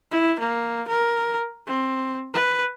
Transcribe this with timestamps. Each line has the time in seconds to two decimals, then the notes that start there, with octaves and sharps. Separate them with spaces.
0.11 E4
0.40 A#3
0.88 A#4
1.67 C4
2.34 B4